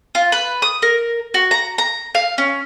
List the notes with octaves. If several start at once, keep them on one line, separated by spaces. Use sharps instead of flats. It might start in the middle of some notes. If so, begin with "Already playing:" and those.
F4
B4
D#6
A#4
F#4
A#5
A#5
F5
C#4